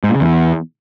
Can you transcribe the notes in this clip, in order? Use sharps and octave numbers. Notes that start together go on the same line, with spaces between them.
G#2
A#2
C#3
E2